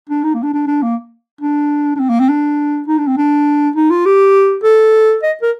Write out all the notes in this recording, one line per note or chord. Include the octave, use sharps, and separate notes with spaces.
D4
D#4
A#3
D4
D4
D4
A#3
D4
D4
C4
A#3
C4
D4
D#4
D4
C4
D4
D#4
F4
G4
A4
D#5
A#4